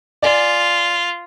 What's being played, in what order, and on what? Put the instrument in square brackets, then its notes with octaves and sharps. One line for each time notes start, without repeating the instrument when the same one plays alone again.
[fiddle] F4 [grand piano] D5 G#5